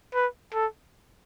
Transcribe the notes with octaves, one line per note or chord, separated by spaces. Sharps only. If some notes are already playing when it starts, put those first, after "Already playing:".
B4
A4